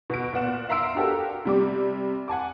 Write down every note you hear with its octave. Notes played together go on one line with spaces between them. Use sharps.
B2 D7
A#2 B3 F#5 E7
E5 F5 A#5 C6 E6 D7
D4 F#4 G4 A4 A#4
C3 G3 D6
F#5 G#5 A5 D6